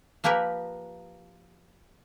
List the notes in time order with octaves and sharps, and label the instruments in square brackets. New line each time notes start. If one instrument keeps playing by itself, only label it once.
[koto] F3 A#3 G4 A#4 B4